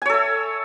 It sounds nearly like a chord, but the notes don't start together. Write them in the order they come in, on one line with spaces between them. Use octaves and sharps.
G#5 C#5 A4 E5